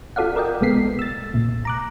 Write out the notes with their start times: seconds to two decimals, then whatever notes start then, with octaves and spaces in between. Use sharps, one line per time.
0.16 F4 F#4 A4 D5 F5 F#5
0.36 A#4 D5 D#5 G5
0.61 B1 G#3 B3 A4 B6 C7
0.99 E6 A6
1.34 B1 A#2
1.65 A#5 D6 F#6